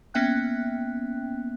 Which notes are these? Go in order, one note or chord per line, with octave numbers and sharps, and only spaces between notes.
A#3 B3 C#4 E5 G5 F#6